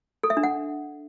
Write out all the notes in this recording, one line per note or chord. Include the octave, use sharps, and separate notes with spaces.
A4
E5
D4
F#5